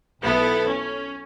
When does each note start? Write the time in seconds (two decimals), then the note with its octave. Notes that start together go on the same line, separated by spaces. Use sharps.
0.21 B1 B3 E4 A4
0.68 C#4